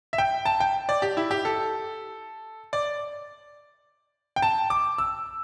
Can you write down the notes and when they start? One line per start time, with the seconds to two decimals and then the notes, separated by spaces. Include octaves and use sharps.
0.13 E5
0.18 G5
0.45 A5
0.60 G5
0.89 D5
1.02 G4
1.17 E4
1.31 G4
1.45 A4
2.73 D5
4.36 G5
4.42 A5
4.70 D6
4.98 E6